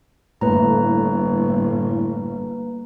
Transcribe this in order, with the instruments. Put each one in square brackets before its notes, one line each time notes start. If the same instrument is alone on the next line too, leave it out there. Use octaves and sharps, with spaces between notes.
[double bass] G1 [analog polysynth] A2 [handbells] A#3 B4 A#5